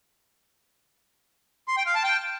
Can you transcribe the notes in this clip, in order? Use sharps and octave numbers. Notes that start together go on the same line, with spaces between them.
C6
G5
F5
A5
G5